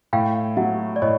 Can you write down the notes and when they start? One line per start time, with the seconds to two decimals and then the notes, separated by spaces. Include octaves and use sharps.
0.13 A2 F5 G5
0.57 F#3 E5 F#5
0.96 D5
1.02 A2 C#5 D#5